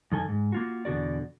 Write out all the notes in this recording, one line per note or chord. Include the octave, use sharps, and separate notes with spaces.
F#2 D#3 A4 G#5
G#2
A#3 F4 F#4
E2 B2 D3 F#4 D5